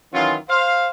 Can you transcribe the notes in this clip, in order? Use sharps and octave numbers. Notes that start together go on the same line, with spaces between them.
D#3 E3 F#3 C#4 F4
C5 F5